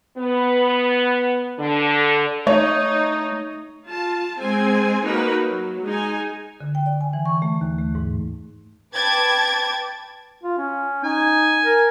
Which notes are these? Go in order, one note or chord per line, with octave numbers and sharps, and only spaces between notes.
B3
D3
A3 D#4 C#5
F4 A5
G#3 C4 G#5 C6
A#3 D#4 F#4 A#4 B4
F#3
G#3 D#4 G#5
D3
G5
D5
G#5
E3
C#6
A3
D#2
A3
G#2
B4 G5 A5 D6 G#6 A6
F4
C#4
D#4 G#5
A#4